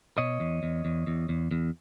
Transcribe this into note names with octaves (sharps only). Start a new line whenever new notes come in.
B2 C#5 D#5
E2
E2
E2
E2
E2
E2